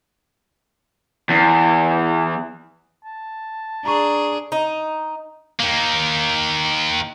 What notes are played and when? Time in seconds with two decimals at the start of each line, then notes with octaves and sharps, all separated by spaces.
1.30 E2
3.05 A5
3.85 D4 G#4 A#5 C#6
4.52 D#4
5.60 D#3 A#3